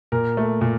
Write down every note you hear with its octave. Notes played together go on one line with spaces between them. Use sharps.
A#2 A#4
A3
A#2